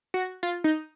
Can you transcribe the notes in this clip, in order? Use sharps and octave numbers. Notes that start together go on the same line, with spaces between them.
F#4
F4
D#4